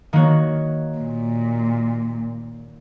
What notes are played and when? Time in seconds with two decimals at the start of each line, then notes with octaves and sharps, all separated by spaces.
0.13 D#3 A#3 F#4 C#5
0.98 A#2